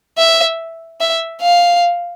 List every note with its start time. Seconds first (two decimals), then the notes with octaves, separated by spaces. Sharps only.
0.18 E5
1.01 E5
1.42 F5